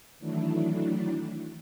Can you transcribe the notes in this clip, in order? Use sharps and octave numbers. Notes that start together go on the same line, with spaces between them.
D#3 E3 F#3 A3 D4 E4